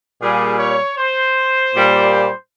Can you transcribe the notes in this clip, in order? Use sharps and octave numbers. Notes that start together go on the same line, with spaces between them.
A#2 G3 G#4
C#5
C5
A#2 G3